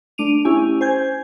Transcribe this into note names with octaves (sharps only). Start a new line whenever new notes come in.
A3 D4 D7 D#7 F7
C#4 E4 G4 G#5
C5 G#5 G6 G#6